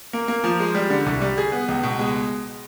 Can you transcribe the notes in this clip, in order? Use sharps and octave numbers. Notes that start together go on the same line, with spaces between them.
A#3
A#3
F3
G#3
G3
D3
C2
G3
G#4
B3
C#2
B2
G#3